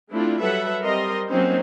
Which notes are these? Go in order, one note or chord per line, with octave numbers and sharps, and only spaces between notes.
A3 C4 D4 E4 F4
F#3 G3 A4 B4 E5 F#5
G3 C4 A#4 D#5 C6
F#3 A#3 C4 C#4 D#4 C5